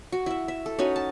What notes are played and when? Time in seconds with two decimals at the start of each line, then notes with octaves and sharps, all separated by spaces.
0.12 F#4
0.26 E4 E5
0.48 E5
0.66 A4
0.79 C#4 D#4 F#4 B4
0.96 A5